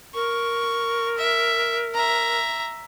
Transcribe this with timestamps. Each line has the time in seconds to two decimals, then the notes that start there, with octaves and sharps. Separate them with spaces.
0.15 A#4 C#6
1.18 E5
1.94 E5 A#5